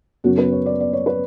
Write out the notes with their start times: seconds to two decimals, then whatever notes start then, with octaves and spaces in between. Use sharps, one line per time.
0.24 F#2 C#3 F#3 B3 F#4
0.38 B4
0.52 C#5
0.66 D5
0.80 D5
0.93 C#5
1.06 B4